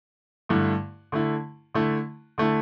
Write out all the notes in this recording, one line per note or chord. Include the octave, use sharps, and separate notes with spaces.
G2 D3 A3 E4
D3 A3 E4
D3 A3 E4
D3 A3 E4